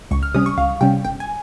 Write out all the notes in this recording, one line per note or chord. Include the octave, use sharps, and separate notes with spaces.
C#2 C#6
F6
C3 G3 C#4 D#6
C#6
C#2 F5
C3 G3 C#4 G5
G1 G5
G#5